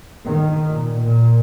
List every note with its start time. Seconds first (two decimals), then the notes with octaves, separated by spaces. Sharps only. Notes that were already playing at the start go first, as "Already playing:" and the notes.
0.25 D#3
0.67 A#2
0.99 A#2